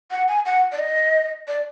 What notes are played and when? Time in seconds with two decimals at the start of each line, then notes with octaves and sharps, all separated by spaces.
0.11 F#5
0.28 G#5
0.46 F#5
0.72 D5
0.79 D#5
1.48 D5